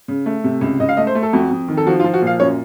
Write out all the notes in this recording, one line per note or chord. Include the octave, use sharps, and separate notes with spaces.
C#3
A3
C3
C#2
C#2 D#5
F5
A3 D#5
C5
A3
A4
F2 F#4
F2
D#3
A4
F3 F#4
F4
F3
F#4
A#2
F5
F#2 C#5